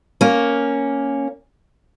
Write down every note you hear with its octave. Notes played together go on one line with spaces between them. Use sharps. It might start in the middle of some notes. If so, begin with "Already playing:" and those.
A#3 C#4